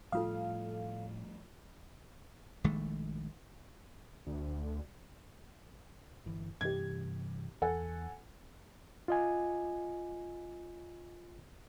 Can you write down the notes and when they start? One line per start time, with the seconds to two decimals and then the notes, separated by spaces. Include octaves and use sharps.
0.12 A2 F3 G3 A3 F4 A4 F5 D#6
2.64 A#1 D#3 G#3 A3
4.27 D2
6.26 G1 E3
6.61 G2 C3 E3 G4 G#6
7.62 E2 A4 F#5 G#5
9.08 F4 D#5 G#5